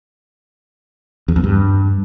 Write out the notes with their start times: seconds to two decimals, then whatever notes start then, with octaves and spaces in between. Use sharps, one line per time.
1.28 E2
1.36 F2
1.44 G2